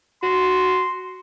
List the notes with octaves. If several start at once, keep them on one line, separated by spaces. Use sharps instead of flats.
F#4 C6